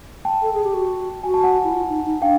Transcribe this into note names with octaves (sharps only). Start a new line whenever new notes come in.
G5 A5
A4
G#4
G4
F#4
F#4 G#5
A5
F#5 G#5
E4
F4
D#4
D#4
D4 F5 G5